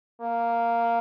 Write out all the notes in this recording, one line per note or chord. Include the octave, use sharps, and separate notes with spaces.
A#3